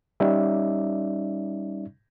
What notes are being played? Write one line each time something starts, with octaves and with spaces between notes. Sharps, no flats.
G3 C#4 D#4 D5 E5